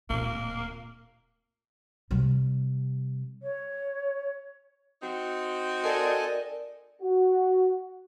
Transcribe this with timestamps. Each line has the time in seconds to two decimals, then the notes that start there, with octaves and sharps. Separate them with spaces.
0.10 D1 A#2 A#3
2.11 C3 G3
3.42 C#5
5.02 C4 D#4 F#4
5.84 A4 A#4 D5 D#5 G#5
7.02 F#4